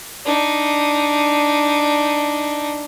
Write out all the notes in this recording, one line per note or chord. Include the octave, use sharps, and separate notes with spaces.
D4 D#4